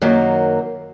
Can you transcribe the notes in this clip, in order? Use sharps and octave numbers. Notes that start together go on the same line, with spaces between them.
F#2 D#3 F#3 A#3